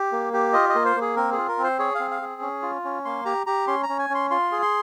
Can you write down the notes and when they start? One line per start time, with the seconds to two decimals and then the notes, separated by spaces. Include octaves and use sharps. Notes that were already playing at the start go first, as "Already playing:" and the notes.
Already playing: G4
0.12 A#3
0.33 G4
0.53 F4 D#5
0.69 D#5
0.75 A#3
0.85 C5
0.96 A#3
1.01 G#4
1.16 C4 A#4
1.33 F4 G#4
1.48 A#4
1.58 C4
1.64 C5
1.79 G#4 C#5
1.95 C4 F5
2.11 F5
2.22 G#4
2.41 C#4
2.62 F4
2.84 C#4
3.05 A#3 C6
3.25 G4 A#5
3.47 G4 A#5
3.67 C#4 C6
3.83 A#5
3.89 C#4
3.99 G#5
4.10 C#4 C6
4.30 F4 C6
4.52 G#4
4.62 C6